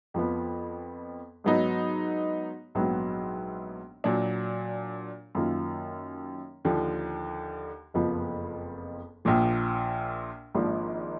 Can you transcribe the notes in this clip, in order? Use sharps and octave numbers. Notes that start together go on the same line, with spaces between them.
F2 F3 B3
G#2 F#3 B3 D#4
A#1 G#2 F#3 B3
A#2 F#3 D4
F#2 D#3 A#3 F4
D#2 D3 F3
F#1 F2 F3 B3 F4
A#1 A#2 F3
G#1 G#2 F3 A#3 D4